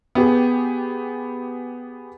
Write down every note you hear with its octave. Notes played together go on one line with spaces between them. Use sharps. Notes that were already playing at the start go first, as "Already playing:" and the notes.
B3 G4 G#4